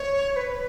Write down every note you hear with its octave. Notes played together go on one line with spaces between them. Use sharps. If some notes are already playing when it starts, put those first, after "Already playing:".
Already playing: C#5
B4